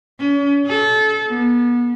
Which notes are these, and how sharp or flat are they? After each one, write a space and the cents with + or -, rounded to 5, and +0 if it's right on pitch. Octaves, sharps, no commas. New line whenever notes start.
C#4 +40
A4 -30
B3 -35